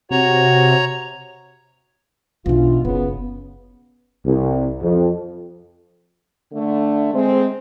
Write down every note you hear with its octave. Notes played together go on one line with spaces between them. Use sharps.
C3 F#4 C#5 A#5
B1 B2 E3 D4 F4
F#1 C#3 B3
C2
F2
D3 A3
G#3 C4